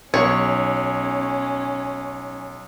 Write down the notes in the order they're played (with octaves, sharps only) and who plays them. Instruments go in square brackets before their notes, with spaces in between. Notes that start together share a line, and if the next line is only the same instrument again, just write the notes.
[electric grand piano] B1 [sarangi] C#4 [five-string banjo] C#5